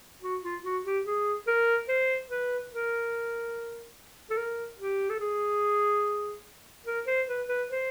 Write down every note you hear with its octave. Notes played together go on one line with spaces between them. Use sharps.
F#4
F4
F#4
G4
G#4
A#4
C5
B4
A#4
A4
A#4
G4
A4
G#4
A#4
C5
B4
B4
C5